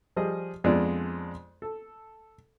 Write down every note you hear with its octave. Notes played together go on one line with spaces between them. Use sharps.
F3 G3 G#4 D#5
F2 G#3 B3 D4 F4 D5
A4